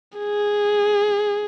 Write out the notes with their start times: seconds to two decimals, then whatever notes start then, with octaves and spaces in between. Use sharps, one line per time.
0.18 G#4